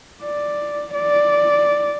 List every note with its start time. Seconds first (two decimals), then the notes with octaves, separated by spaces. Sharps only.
0.23 D5
0.94 D5